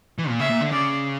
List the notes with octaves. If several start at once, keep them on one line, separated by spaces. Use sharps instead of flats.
E3
A#2
C#3 E5
A#2
D3
C#3 D5